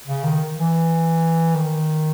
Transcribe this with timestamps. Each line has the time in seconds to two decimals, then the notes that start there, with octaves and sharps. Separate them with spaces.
0.07 C#3
0.24 D#3
0.57 E3
1.55 D#3